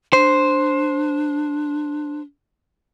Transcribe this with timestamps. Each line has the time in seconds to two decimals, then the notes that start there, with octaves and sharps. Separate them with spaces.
0.13 D4 C5